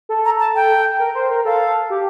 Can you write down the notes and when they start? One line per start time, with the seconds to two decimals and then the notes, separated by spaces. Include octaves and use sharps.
0.09 A4
0.25 A#5
0.39 A5
0.55 G5
0.99 A#4
1.15 C5
1.30 A#4
1.45 A4 F5
1.90 G4